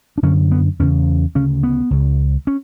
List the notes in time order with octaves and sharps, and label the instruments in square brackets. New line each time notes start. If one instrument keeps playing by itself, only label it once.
[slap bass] D4
F#2 D3 C#4
B3
E2 C#3 C#4
D2 C#3 C#4
B3
C#2 C#3
C#4